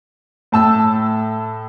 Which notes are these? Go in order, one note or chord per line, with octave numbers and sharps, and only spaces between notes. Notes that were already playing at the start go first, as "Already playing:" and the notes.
A2 A5 E6